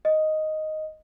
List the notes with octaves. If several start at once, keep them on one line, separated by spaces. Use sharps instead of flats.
D#5